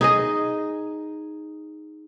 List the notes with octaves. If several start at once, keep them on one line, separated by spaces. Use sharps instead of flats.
D#4 G#4 D#5